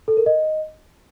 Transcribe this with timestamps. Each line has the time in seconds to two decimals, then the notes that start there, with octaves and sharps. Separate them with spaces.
0.08 A4
0.17 A#4
0.26 D#5